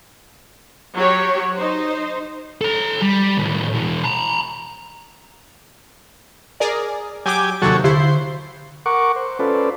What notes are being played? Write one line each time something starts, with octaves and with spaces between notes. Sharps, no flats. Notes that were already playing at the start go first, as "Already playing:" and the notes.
F#3 F#4 G4 C#5
D#4 C5
A4 A#5
G3
D#2 A2
B2 E3
A5 A#5
G#4 A#4 D5
F#3 G4 G#5 D6
D#2 C3 F#3 F#4 A4 C#5
D3 E4 C5
A#4 F#5 C#6 D6
C5
C#4 F4 A4 B4 C5 D5